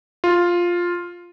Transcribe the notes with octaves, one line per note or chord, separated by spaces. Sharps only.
F4